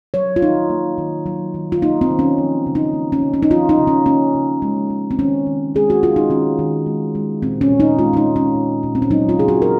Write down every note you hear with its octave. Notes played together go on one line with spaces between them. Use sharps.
F#3 C#5
F4
D#3 D#4
A#3
D#3
F#3
D#3
F4
A#3 D#4
C4
D#3
C#4
F3
C#3
D#4
A#3
C#4
C#3
C#4
D#4
F3 F4
D#4
C#3
C#4
A#3 C#4
C#3
G#3
G#3
C4
D#3 C#4
D#3
G#3 G#4
F#4
G#3 F4
D#4
D#3 C#4
D#3
G#3
G#3
A#2 C4
C#4
A#2
D#4
G#3 F4
C#4
D#4
G#3
C#4
A#2
A#2
C4
C#4
F#3 D#4
F4
C#3 G#4
F#4
A#4